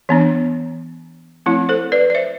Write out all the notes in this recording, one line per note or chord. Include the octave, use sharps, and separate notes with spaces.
E3 B3 D4
F3 A3 C4 E4
A4 C5
B4 D5
D5
C5 E5